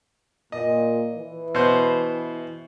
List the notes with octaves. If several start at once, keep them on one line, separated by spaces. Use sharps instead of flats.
A#2 D#5
E3
B2 C5